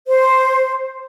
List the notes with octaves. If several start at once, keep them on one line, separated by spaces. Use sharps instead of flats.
C5